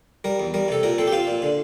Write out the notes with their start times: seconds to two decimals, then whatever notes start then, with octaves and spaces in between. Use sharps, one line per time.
0.24 G3 A#4
0.40 E2
0.54 G3 A#4
0.68 C3 A4
0.83 A#2 A#4
0.98 C4 A4
1.07 G4
1.13 C4 F4
1.27 A#2
1.42 D3